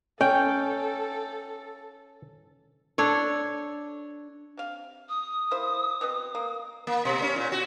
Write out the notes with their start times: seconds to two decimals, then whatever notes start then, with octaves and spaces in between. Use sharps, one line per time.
0.21 C#4 A4 G5
2.98 D4 A4 C#5
4.57 C3 F5
5.09 D#6
5.51 A#3 E4 C5
6.01 B2 C4 B4
6.35 A#3
6.87 A#3
7.05 B2
7.22 C#4
7.36 A#2
7.52 F#4